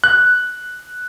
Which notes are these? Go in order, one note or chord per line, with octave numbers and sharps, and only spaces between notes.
F#6